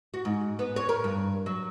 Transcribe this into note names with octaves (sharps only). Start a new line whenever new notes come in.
F#4
G#2
B3
C#5
A#4
G2
F#3